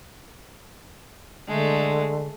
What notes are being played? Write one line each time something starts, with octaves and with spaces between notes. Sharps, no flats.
D3 G#3 A3